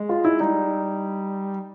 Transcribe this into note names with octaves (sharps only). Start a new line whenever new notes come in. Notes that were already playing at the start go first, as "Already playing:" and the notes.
Already playing: G#3
F4
E4
G3 D#4